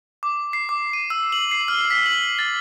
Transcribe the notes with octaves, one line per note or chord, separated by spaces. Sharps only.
D6
C7
D6
D#7
E6
F#7
C7
F6
B6
F#7
A6